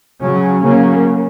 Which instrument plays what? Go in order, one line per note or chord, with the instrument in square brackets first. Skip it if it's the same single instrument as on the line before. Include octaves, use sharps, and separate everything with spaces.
[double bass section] C#3 F#3 C#4
C#3 F#3 A#3 C#4